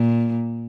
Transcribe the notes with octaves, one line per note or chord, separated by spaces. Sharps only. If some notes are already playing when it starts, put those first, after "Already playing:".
Already playing: A#2